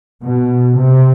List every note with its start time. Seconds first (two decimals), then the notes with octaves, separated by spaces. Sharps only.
0.25 B2
0.78 C3